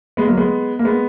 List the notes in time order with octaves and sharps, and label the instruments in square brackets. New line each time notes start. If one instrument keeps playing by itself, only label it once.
[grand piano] G#3 B3
F#3 A#3
G#3 B3
A#3
G#3 B3